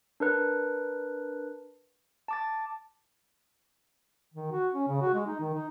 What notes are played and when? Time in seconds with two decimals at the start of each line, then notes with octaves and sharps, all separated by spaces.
0.20 D4 A#4 B4
2.28 A5 D6 A6
4.34 D#3
4.52 F#4
4.74 C#4
4.88 C#3
5.01 F#4
5.14 G#3
5.27 D#4
5.40 D#3
5.55 D#4